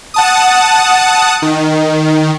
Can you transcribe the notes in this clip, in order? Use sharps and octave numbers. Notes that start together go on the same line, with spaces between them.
F#5 A5 D#6
D#3